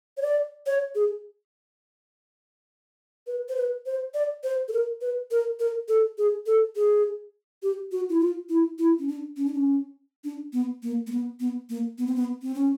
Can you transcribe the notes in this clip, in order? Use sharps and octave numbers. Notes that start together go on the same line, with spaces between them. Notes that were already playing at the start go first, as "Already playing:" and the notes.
C#5
D5
C#5
G#4
B4
C5
B4
C5
D5
C5
A4
A#4
B4
A#4
A#4
A4
G#4
A4
G#4
G4
F#4
E4
F4
E4
E4
C#4
D4
C#4
D4
C#4
D4
B3
A#3
A#3
B3
B3
A#3
B3
C4
B3
C4
C#4